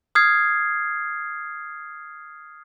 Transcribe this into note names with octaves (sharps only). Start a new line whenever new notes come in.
D#6 F6 G#6 C7